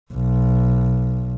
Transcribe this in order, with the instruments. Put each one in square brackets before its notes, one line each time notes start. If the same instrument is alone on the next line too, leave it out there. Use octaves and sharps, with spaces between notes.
[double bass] B1